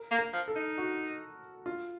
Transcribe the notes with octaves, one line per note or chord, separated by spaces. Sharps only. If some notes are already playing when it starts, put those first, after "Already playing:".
Already playing: A#4
A#3
A#4
F3
A4
D#4
F#4
F4